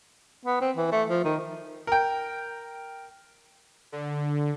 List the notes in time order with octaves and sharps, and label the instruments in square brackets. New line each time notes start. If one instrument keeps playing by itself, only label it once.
[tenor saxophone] B3
C4
E3
A3
F3
D#3
[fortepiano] A#4 G5
[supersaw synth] D3